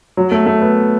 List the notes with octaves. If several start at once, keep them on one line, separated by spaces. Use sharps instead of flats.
F#3
A3
A3
B3